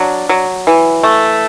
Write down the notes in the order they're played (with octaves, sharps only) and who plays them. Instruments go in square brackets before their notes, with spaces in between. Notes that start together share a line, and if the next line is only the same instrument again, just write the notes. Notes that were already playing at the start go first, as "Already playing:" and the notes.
Already playing: [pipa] F#3 D4
F#3
E3
A3